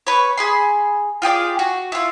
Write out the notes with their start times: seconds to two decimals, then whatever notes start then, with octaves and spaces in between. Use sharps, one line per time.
0.07 B4 C#5
0.37 G#4 B5 C6
1.22 F4 G4 G#4 D5
1.59 F#4
1.92 E4 F4